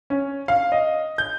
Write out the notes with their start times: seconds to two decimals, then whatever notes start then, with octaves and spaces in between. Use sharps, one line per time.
0.10 C#4
0.48 F5
0.72 D#5
1.18 G6